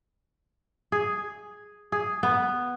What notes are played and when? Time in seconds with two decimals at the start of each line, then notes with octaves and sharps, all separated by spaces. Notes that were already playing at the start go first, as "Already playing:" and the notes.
0.92 G#4
1.92 G#4
2.23 B3